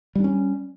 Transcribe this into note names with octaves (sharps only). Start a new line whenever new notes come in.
G3 C#4 D4